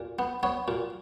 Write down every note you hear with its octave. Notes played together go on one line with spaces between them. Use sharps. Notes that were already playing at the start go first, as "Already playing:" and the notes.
Already playing: A#2
B3
B3 C#5
A#2